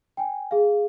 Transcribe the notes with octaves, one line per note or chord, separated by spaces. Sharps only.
G5 G#5
G#4 F5